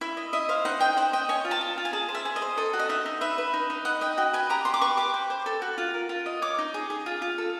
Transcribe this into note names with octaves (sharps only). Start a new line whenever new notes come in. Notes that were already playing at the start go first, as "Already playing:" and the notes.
E4 E5
D#5
D#5 E5
C5 F5
D#4 F#5
D#5 G5
C5 F#5
D#5 G5
C#5 G#5
F4
A5
F4
F4
G#5
G#4 A5
C5
E5
G#4
D#5
C5
A4 D#5
F#4
D#5
D#4 E5
D#4
B4 E5
B4
D#4
D#4
D#5 F#5
D#5 G5
F#4 G5
B4 G#5
G4 A#5
G4 C6
D6
B4 C#6
G4 D6
C5
C5
A4
F#4
F4
A#4
F4
D#5
C#5 D6
D#4
G#4
G#4
F4
F4
A4